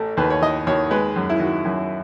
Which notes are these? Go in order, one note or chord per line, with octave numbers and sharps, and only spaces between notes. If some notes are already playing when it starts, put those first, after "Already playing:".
Already playing: A1 A3
D#2 B4
C#5
D#3 D#5
D#2 C#5
G#3 B4
F#2
E4
D#3 F#4
F#2